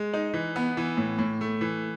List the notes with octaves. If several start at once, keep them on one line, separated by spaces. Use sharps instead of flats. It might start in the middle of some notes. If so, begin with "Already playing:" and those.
Already playing: G#3
D#4
E3
B3
E3
A2
A2
A3
E3